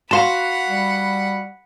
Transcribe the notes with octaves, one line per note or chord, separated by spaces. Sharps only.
F#4 F5 F#5 A5 B5 C6
G3